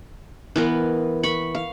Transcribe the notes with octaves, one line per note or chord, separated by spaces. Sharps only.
E3 B3 A#4
B5 C#6
F5